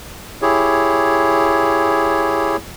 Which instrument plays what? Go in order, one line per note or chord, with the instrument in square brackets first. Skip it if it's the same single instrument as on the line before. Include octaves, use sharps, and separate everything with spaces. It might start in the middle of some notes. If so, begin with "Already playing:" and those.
[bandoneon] E4 G4 G#4 C#5